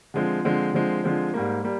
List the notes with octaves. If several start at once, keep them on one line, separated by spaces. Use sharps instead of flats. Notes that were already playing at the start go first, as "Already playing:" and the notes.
D3 F3 G#3 C4
D3 F3 G#3 C4
D3 F3 G#3 C4
D3 F3 G#3 C4
G#2 G3 A#3
G3 A#3